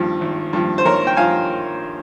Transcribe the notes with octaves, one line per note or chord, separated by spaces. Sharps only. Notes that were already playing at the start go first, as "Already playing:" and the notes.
Already playing: G#1 G2 F3
G#1
G2 F3
C5
G#1 A#4 C#5
G5
G2 F3 F5 G#5